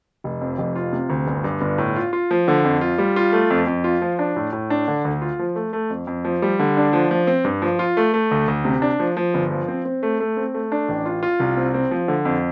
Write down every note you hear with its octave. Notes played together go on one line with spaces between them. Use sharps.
F1
F2
F1
F4
C3
D2
G1
G2
G1
A2
F4
F4
F3
D3
F2
F4
G3
F4
A3
F2
F2
F4
F3
D4
A2
A2
D4
D3
D2
F4
F3
A3
A3
F2
F2
F3
G3
D3
D4
F3
F3
C4
G2
F3
F4
A3
A3
D2
D2
C3
D4
F3
F3
G1
F3
C4
C4
A3
A3
C4
A3
D4
A1
F4
F4
C2
C4
C4
F3
D3
F2